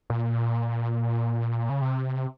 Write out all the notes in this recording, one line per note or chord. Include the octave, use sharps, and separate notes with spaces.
A#2
C#3
C3